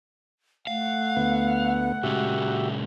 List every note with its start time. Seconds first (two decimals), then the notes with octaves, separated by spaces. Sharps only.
0.67 A3 F5 F#5
1.17 D2 B3
2.03 A#2 C#3 G#3 F#4 G4 E5